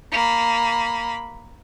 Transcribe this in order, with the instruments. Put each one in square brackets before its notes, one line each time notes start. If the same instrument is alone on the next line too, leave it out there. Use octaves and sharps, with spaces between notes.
[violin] A#3 B5